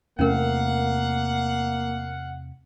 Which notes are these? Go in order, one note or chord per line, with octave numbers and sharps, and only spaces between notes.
E2 C3 A3 A#3 C#4 A#4 F5 F#5